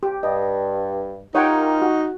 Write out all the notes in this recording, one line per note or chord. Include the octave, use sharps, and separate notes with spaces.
G4
G2 D#5
D#4 F4 G4 A#4 C#5 F#5 G5
F#4